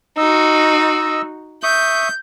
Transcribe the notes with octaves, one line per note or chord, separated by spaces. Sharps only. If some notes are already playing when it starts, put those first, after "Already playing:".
D#4 F#4 D#5 E6
E5 C#6 D#6 G6